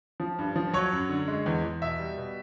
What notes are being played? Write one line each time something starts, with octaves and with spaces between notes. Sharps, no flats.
F3
G2
F3
F#3 C#5
F#2
D3
G#3
E2
E2
B2 E5
G3
B2